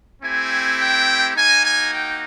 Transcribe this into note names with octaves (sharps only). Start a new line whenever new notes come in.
A3 C4 E4 G4 G#5
G5
A#3 D#4 F#4 G#5
G#5
G5